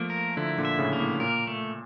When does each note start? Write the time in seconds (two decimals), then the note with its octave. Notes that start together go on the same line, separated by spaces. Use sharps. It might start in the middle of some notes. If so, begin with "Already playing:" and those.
Already playing: F3 A3 A#3
0.10 A#4
0.37 D3 F3 E4
0.58 A#2 D3
0.65 E5
0.78 A2 C#3
0.93 A#3
1.00 A2
1.20 A#2 A#4
1.47 A3